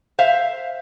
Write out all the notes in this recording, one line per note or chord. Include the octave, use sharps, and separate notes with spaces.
C5 E5 F5